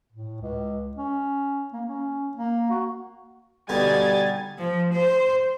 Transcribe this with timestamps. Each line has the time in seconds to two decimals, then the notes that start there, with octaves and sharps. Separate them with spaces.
0.12 A2
0.41 C#2
0.97 C#4
1.73 A#3
1.87 C#4
2.37 A#3
2.70 F#4
3.69 B2 D3 G3 D#4 G#5 G#6 A6
4.58 F3
4.93 C5